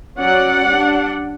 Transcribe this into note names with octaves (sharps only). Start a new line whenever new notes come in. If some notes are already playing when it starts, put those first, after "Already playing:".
F#3 C#4 D5 F#5
G3 D4